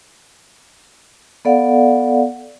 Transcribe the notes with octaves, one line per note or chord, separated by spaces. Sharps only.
B3 A4 D5 F5 F#5